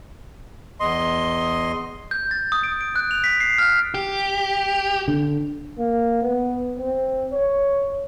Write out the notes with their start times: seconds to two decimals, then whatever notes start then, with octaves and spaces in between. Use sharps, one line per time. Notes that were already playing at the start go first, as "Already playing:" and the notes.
0.80 E2 D#5 C6
2.11 G6
2.31 A6
2.52 D#6
2.63 D7
2.81 D7
2.96 F#6
3.11 F7
3.24 B6
3.40 C7
3.58 F6
3.94 G4
5.08 D3
5.78 A#3
6.22 B3
6.79 C4
7.32 C#5